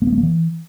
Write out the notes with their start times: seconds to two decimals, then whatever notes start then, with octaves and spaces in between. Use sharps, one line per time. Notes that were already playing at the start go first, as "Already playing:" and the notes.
0.02 A#3
0.07 B3
0.12 A3
0.18 A#3
0.23 E3